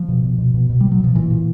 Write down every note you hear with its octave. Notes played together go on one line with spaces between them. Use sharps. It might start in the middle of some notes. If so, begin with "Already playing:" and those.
Already playing: F3
B2
B2
B2
B2
B2
B2 G3
F#3
B2 F3
A#2 E3
A#2